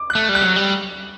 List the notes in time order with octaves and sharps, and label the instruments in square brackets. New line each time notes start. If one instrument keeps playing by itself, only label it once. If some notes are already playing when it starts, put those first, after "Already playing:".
Already playing: [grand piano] D6
F#6
[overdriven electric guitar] A3
G3
[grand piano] F#6
[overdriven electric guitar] F#3
G3